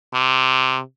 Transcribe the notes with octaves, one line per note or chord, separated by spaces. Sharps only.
C3